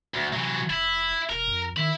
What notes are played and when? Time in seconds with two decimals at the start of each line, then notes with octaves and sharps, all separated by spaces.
0.14 D2
0.33 C3 E3 F#3
0.70 F1 E4
1.30 E1 A#4
1.47 F2
1.77 D#3 E5 B5